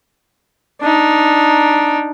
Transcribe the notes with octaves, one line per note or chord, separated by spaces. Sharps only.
D4 D#4